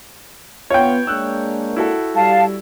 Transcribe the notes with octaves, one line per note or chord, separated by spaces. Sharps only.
B3 F4 C#5 G5
G#3 A#3 D4 E6 F#6
E4 F#4 A4
G3 F5 A5